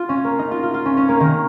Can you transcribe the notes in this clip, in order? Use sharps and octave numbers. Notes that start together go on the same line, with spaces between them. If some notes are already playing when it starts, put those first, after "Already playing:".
Already playing: F4
C#4
A#3
D#4
F4
F4
F4
C#4
C#4
A#3
D#3